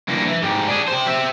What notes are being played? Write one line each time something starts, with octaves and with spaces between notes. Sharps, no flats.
G2 A#3
E3
G#2 G4
D4 G#4
G4 C5
C4 E5